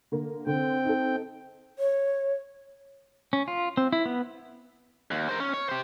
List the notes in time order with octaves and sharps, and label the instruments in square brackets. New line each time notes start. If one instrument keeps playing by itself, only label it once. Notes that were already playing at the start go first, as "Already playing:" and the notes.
[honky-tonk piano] D3 A#3
[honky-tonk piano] D3 [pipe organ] C4 G5
[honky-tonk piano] D#4 A4
[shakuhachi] C#5
[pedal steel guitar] C#4
F4
C4
E4
B3
[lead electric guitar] D#2
A#4 C5
C#4
C#5
G4 C5